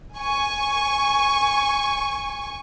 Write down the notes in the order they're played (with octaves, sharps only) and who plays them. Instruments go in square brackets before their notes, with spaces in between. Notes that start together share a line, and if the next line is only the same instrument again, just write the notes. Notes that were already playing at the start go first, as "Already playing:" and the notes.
[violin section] G#5 C#6